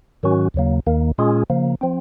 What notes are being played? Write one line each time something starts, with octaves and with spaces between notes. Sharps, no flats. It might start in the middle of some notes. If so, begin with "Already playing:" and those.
G#2 D#3 F#3 C#4 F#4
D#2 C#3 F#3 A#3
D#2 D#3 A#3
A#2 G#3 C#4 F4 G#4
C#3 F3 A#3
F3 C4